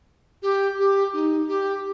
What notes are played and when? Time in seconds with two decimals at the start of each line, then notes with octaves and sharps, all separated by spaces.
0.42 G4
0.79 G4
1.13 D#4
1.48 G4